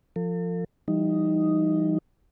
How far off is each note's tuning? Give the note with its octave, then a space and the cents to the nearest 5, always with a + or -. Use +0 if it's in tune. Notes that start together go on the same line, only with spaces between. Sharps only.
F3 +0 A4 +40
E3 +40 G3 +0 D#4 +0